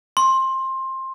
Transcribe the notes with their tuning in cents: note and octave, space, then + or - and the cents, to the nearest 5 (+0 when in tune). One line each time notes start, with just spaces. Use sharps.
C6 +20